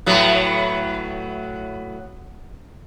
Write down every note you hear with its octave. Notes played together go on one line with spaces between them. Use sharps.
A2 F#3 B3